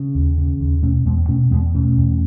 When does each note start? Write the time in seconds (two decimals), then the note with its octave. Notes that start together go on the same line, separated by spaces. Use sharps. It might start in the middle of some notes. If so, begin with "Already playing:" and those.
Already playing: C#3
0.15 D#2
0.38 C#3
0.60 D#2
0.83 B2 A3 C#4
1.05 E2 G#3 B3
1.28 B2 A3 C#4
1.51 E2 G#3 B3
1.75 B2 A3 C#4
1.97 E2